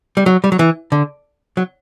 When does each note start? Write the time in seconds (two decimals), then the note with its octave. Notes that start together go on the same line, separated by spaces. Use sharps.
0.17 G3
0.26 F#3
0.44 G3
0.52 F#3
0.59 E3
0.92 D3
1.57 F#3